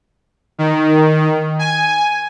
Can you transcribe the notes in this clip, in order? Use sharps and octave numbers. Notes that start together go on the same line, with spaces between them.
D#3
G#5